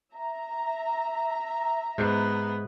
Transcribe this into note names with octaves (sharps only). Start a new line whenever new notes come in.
E5 A#5
G#2 B3